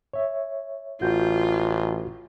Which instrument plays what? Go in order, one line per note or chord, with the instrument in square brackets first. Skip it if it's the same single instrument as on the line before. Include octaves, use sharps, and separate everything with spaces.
[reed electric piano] C#5 E5
[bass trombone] A1 [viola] F4 [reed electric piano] F#4 G6